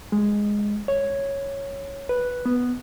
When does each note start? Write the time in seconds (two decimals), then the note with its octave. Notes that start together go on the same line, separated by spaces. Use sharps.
0.12 G#3
0.88 C#5
2.09 B4
2.45 B3